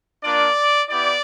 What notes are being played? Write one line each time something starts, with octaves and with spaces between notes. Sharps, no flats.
A#3 D4 F4 D5
B3 E4 G4 D5